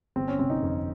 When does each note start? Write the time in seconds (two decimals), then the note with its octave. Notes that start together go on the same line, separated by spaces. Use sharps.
0.16 G1 C4
0.28 C#4
0.39 C3 C4
0.50 D#4
0.63 F2